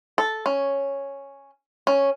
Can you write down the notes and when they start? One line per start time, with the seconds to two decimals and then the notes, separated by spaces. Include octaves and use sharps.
0.18 A4
0.46 C#4
1.87 C#4